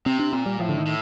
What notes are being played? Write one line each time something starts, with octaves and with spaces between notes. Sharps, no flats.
C3 C4
D4
A#2 C4
G3
A2 F3
D3
D#3
A2